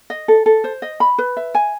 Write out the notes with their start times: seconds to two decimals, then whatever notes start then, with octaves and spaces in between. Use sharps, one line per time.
0.10 D#5
0.28 A4
0.46 A4
0.64 C5
0.82 D#5
1.00 B5
1.18 B4
1.37 E5
1.55 G#5